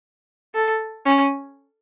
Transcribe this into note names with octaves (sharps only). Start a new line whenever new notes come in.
A4
C#4